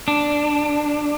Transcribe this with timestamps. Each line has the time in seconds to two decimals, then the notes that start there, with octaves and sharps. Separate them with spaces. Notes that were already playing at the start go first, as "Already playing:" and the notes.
0.08 D4